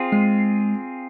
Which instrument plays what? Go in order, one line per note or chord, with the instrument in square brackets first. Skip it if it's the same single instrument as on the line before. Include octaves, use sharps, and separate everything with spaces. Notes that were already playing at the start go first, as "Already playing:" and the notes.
Already playing: [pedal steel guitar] C4 F4 G#4
[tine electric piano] G#3